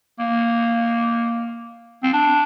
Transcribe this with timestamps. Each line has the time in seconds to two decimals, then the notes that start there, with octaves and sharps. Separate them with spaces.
0.19 A#3
2.03 C4
2.13 D4